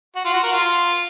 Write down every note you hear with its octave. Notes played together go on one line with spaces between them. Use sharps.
F#4
F4
F#4
A#4
F4